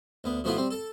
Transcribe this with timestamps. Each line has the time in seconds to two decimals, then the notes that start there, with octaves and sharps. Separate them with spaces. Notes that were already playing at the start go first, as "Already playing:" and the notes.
0.24 D2 B3
0.44 B2 F3 A3 B3 E4 F4
0.57 G3 C4
0.71 A4 A5